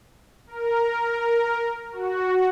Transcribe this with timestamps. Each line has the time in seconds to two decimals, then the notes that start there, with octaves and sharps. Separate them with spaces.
0.47 A#4
0.97 A#4
1.92 F#4